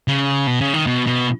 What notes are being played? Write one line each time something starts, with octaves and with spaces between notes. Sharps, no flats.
C#3
B2
C#3
D#3
B2
B2